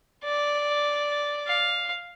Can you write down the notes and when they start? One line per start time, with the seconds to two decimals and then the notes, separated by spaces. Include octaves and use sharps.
0.24 D5
1.48 F5